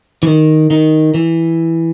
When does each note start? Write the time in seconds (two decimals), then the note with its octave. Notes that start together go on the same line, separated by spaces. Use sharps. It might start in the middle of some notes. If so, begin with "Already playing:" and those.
0.23 E3
0.27 D#3
0.70 D#3
1.14 E3